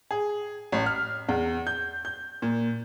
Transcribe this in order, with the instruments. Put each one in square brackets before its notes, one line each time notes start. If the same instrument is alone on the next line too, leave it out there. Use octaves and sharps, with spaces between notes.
[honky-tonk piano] G#4
A1
F6
E2
G6
G6
A#2